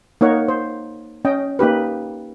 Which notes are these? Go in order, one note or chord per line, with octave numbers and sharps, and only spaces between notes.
A#3 D#4 C#5 F#5
C5
C#4 D#5 G5
A#3 D#4 G4 B4